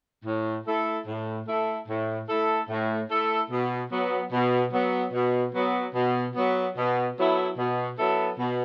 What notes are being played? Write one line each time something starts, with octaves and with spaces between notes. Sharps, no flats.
A2
A3 E4 A4
A2
A3 E4 A4
A2
A3 E4 A4
A2
A3 E4 A4
B2
F#3 B3
B2
F#3 B3
B2
F#3 B3
B2
F#3 B3
B2
F#3 B3 E4 A4
B2
F#3 B3 E4 A4
B2